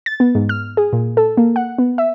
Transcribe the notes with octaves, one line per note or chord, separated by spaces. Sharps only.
A6
B3
G#2
F6
G#4
A#2
A4
A#3
F#5
B3
E5